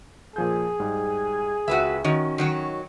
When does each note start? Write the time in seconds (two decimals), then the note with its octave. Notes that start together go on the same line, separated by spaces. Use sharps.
0.36 A#2 F3 G#4 G6
0.80 G#2 G3
1.68 C#2 F#4 B4 E5
2.04 D#3 C#4 F#4 D#5
2.38 D#3 F#3 C#5